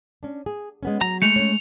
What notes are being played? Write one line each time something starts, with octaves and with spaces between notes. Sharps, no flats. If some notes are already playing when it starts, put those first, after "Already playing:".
C#4 D4
G#4
G#3 B3 C#4
F#3 A#5
G#3 A3 C#7 F7
C#4 C#5